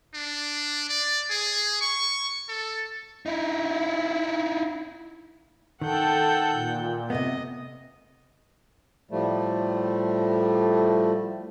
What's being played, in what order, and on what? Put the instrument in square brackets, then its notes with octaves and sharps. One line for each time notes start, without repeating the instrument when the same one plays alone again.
[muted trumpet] D4
D5
G#4
C#6
A4
[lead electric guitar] D#4 E4
[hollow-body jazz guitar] D#3 [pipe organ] A4 [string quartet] F#5 G5 G6
[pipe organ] A#2
[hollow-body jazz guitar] C3 A3 B3 [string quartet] D#5
[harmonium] A2 F3 G3 A3